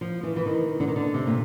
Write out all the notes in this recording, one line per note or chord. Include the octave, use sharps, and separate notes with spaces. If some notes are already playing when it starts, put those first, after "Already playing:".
F3
E3
E3
D#3
D3
D#3
D3
C3
A#2